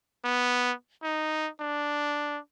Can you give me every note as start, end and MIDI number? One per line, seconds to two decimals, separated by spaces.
0.24 0.73 59
1.03 1.49 63
1.61 2.38 62